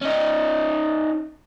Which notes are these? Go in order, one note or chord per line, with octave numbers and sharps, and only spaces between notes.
C#4 D#4